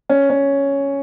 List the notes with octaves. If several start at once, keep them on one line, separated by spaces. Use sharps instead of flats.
C#4
C#4